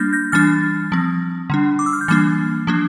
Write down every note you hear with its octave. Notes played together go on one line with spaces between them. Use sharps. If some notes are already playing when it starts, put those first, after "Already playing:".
Already playing: G3 A#3 D4 F6 G6 A6 A#6
G6 A#6
E3 G3 D4 F6 A6
F3 C4
D3 G3 D4
D6
E6
F6
G6
E3 G3 A#3 D4 F6 A6
F3 A#3 D4